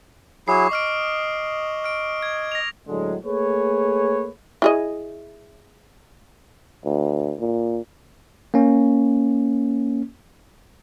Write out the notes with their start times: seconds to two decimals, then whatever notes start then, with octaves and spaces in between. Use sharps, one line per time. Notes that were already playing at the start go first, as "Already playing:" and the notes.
0.48 F#3 E4 G#4 C#6 D6 C7
0.71 D#5 D#6 F6 D7
1.84 F6 D7
2.22 G#6
2.52 A#6 F7
2.88 A2 D3 F#3 G#3
3.25 A3 A#3 G#4 B4 C#5
4.62 E4 G#4 D#5
6.85 D2
7.40 A#2
8.54 A#3 C#4